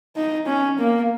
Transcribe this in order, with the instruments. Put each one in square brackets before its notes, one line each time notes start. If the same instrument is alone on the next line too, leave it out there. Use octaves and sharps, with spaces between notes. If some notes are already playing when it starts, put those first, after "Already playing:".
[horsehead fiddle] D#4
C#4
A#3